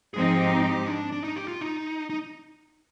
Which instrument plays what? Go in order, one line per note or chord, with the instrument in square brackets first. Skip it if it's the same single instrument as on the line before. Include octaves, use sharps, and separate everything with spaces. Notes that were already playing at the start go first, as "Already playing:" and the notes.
[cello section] G#2 F3 C4 D#4 [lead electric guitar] G#4
[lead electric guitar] G#4
G4
G4
D4
D4
D#4
G4
F4
D#4
D#4